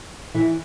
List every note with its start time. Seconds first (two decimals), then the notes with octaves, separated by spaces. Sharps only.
0.34 E3 E4